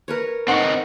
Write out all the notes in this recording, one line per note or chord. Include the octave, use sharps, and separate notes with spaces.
A#4 B4 C#5
C4 D#4 F#5 C#6